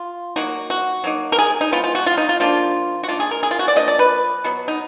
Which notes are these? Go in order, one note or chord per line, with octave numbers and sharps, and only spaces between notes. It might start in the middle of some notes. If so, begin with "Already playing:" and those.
Already playing: F4
F#3 A#3 D#4 F#4
F#4
F#3 A#3 D#4
A#4
G#4
D#4
F3 G#3 B3 F4
F4
F#4
F4
D#4
F4
F3 A#3 D4 F4
F#4
D#3 A#3 D4 F4
G#4
A#4
G#4
F4
F#4
D5
F3 A#3 D4 D#5
D5
B4
B2 F#3 B3
D#4